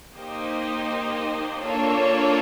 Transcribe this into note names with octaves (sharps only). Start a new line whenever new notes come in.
A#3 D#4 G4 C5 D#5
A#3 D4 F4 A4 C#5